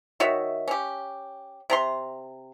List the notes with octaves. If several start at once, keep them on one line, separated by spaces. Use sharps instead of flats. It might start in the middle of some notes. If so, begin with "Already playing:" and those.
D#3 F#4 C#5 E5
C#4 G4
C3 A#5 C6